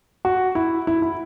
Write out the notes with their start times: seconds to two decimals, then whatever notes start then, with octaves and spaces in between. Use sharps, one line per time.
0.25 F#4
0.55 E4
0.87 E4
1.02 E4